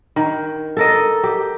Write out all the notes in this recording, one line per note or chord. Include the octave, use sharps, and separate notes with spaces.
D#3
A4 A#4 D#5
G4